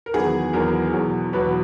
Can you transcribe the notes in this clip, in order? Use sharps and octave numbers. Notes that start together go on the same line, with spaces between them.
A#4
E2 D#3 F#3 B3 G#4
E2 D#3 F#3 B3 A#4
E2 B2 F#3
E2 B2 F#3 B4